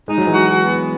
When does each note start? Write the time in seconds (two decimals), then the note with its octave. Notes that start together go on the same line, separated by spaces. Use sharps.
0.08 G#3 D#4
0.18 F#3
0.27 E3 G#3
0.34 F#4
0.61 B3